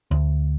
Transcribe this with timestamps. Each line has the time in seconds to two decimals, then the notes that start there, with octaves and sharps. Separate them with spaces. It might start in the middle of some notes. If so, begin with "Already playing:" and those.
0.11 D2